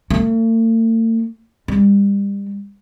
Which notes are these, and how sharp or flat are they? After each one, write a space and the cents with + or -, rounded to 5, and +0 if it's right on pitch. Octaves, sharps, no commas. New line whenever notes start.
A3 +45
G3 +35